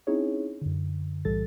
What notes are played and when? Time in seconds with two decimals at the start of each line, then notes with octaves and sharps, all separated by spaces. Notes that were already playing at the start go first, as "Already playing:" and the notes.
0.07 C4 C#4 D#4 E4 G#4 C#5
0.61 F#2 D3
1.25 B1 A2 E3 G3 A4 A6